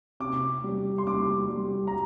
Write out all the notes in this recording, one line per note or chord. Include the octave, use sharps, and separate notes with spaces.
C3 D6
G3
C6
G3 D6
G3
A#5